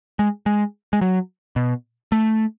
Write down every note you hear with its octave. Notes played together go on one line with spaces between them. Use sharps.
G#3
G#3
G#3
F#3
B2
A3